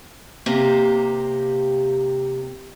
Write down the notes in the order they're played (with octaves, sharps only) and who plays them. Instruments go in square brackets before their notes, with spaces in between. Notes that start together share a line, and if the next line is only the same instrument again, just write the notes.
[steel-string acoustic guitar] C3 A#3 G4